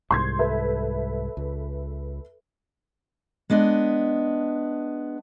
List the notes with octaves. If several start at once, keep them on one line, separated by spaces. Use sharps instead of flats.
C2 G#2 C6 G6 G#6
A4 B4 E5
C#2
G#3 B3 D4 D#5